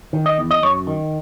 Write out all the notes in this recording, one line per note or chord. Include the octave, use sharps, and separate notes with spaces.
D#3
D#5
E2
D#5
F#2 C#5
D#3